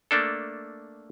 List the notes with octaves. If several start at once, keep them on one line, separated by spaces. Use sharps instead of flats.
A3 A#3 D4 A4